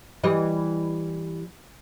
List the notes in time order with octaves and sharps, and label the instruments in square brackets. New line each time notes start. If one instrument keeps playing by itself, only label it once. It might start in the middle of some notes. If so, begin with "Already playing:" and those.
[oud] E3 G3 D#5